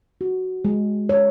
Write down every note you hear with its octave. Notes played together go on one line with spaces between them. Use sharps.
F#4
G#3
C#5